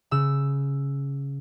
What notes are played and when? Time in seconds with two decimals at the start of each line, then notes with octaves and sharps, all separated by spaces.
0.11 C#3 E6